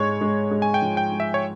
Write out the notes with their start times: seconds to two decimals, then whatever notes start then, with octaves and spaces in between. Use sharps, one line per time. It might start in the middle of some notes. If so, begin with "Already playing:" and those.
Already playing: G#2 G#3 C#5
0.21 G#3
0.51 G#3
0.62 G#5
0.74 G5
0.82 F3
0.97 G5
1.12 G#3
1.20 E5
1.34 C#5